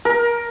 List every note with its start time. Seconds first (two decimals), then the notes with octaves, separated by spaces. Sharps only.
0.05 A#4